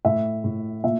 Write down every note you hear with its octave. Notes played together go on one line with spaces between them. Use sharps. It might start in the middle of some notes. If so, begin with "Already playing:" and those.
A2 E5
A2
A#2 E5